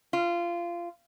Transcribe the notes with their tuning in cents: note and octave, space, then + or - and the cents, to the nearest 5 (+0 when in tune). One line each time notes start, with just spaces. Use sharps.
F4 -20